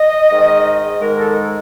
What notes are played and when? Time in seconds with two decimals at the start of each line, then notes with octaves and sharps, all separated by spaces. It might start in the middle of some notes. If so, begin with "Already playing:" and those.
Already playing: D#5
0.31 G#2 D#3 G#3
1.00 G#2 D#3 G#3 A#4
1.17 A4